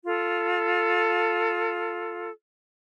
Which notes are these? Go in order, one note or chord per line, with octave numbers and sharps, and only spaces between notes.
F4 A4